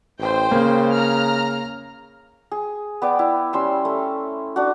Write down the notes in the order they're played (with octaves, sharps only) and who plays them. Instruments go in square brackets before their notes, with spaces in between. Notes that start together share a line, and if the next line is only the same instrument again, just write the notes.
[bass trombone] A1 [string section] C5 G5
[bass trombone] C#3 [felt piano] A#3
[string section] A#5 F6
[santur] G#4
B3 D5 G5
E4
G3 C#4 C6 E6
A3
D4 F#4